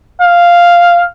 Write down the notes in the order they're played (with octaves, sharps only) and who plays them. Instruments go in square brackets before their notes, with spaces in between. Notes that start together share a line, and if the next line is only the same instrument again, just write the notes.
[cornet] F5